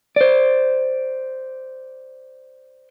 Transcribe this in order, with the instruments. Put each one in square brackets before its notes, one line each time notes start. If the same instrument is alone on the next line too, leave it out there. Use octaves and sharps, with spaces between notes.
[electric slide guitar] C5 D5